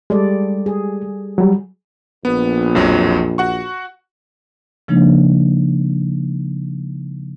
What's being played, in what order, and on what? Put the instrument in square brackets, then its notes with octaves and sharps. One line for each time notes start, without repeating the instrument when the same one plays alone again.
[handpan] G3 A4 D5 [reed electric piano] G#3
[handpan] G#4
[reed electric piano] F#3 G3
[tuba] A#1 [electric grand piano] B3
[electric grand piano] B1 F2 F#3
F#4 F#5 C#6
[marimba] C#3 F3 G#3 A#3 D4 D#4